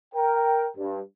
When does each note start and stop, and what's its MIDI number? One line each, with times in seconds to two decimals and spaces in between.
0.14 0.66 70
0.14 0.66 79
0.77 0.99 43